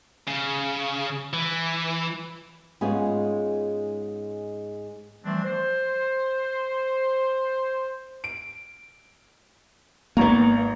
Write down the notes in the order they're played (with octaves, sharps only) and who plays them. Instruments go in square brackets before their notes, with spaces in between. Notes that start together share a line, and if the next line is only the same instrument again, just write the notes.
[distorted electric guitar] C#3
E3
[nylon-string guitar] G#2 G#3 B3 C#4 F4 G#4
[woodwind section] E3 F3 G3 A3 C4 D4
C5
[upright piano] D7
[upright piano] G#1 A#5 C#6 [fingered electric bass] A#3 B3